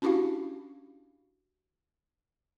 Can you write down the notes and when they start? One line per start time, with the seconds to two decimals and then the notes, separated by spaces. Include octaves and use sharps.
0.02 C#4 D4 E4 F#4 G4 F5